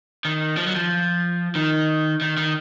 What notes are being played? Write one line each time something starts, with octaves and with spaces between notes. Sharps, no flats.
D#3
F3
F#3
F3
D#3
D#3
D#3